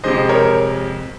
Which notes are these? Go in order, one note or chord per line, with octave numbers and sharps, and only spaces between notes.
F2 C3 F3 G#3 C5 D#5
A#4 C#5